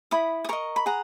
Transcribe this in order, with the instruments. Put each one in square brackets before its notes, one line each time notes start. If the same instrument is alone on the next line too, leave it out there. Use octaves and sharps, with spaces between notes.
[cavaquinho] E4 B5 D#6
D#6
A#4 D#5 A#5 C#6
B5
G#4 F#5 A#5